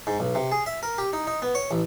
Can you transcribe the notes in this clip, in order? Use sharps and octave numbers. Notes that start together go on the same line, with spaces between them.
G#2
B1
C3
G#4
E5
A#4
G4
D#4
D#4
B3
C#5
A1